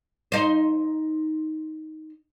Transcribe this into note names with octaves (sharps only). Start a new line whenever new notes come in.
D#4 C5